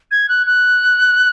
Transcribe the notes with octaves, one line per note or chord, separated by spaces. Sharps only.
G#6
F#6
F#6